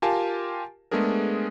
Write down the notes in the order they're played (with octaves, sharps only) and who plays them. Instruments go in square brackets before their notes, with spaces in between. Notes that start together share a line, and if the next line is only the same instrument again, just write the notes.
[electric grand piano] F4 G4 A#4 F5 G#5 A5
G#3 A3 B3 D4 G#4 A#4